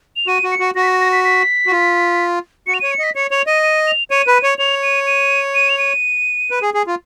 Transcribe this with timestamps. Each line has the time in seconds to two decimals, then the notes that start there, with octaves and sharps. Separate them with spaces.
0.16 F7
0.27 F#4 D#7
0.44 F#4
0.52 C#7
0.59 F#4
0.75 F#4 A#6
0.83 B6
0.88 A#6
1.00 A#6
1.12 B6
1.24 B6
1.67 F#4
1.72 F4
2.67 F#4 C#7
2.74 F7
2.80 C#5 D#7
2.92 C#7
2.99 D#5 B6
3.15 C#5 C#7
3.31 C#5 F7
3.47 D#5 D#7
3.63 D#7
3.87 F7
4.11 C#5 D#7
4.27 B4
4.43 C#5
4.58 C#5 F7
4.83 D#7
5.07 D#7
5.55 D#7
5.69 F7
5.78 D#7
6.51 B4
6.62 G#4
6.74 G#4
6.87 F4